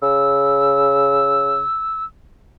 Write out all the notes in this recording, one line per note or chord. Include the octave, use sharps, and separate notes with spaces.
C#3 E6